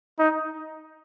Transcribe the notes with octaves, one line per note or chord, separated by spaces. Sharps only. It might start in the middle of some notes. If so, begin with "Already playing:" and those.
D#4